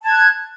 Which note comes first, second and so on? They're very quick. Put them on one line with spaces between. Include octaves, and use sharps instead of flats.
A5 G#6 F#6